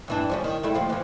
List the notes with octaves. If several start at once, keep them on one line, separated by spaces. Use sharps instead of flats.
G2 E3 D4
F3 G3 C#4
D#3
G3 A3 E4
D#2 F3 F4
E3 F3